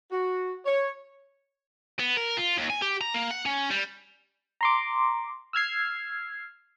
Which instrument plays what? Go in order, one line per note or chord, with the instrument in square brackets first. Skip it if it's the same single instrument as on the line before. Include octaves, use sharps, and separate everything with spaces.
[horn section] F#4
C#5
[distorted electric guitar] B3
A#4
F4
D#2
G#5
G4
A#5
A#3
F#5
C#4
G3
[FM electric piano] A#5 C6 D6
E6 F6 G#6 C7